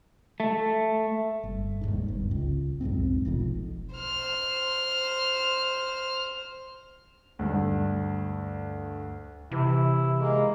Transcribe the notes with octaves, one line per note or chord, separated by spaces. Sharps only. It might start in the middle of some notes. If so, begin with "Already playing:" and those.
A3
G1
D#1 G#1 G#2
G1
C#2
B1 F2 G#2 C4
F1 B1 F2
C5 F6
D2 G2 D3
C3 E3 E4
G#3 A#3